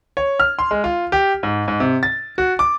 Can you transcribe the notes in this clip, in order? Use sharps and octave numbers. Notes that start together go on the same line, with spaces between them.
C#5
F6
C6
G#3
F4
G4
G#2
G#2
C3
A6
F#4
D6